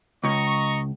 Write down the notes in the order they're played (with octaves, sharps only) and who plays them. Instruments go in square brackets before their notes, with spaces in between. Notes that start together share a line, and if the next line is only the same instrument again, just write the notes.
[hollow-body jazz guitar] C#2 [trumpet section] D#5 A#5 C#6